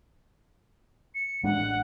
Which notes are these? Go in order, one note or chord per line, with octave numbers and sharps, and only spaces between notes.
C#7
A1 G#3 D4 F#5